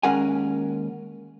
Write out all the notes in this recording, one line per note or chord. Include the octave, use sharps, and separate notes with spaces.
D#2 G#3 C#4 A#4 F#5 G#5